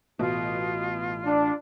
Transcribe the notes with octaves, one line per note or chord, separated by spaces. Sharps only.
A1 B2 F4
D4